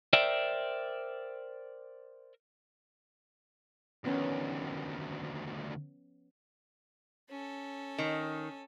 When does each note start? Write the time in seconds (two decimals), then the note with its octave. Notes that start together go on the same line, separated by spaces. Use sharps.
0.13 A#4 C5 D5 E5 G5
4.04 D2 D#3 F3 B3 C#4
7.30 C#4 A4
7.98 D#3